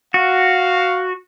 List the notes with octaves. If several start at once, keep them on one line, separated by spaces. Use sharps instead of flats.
F#4 F5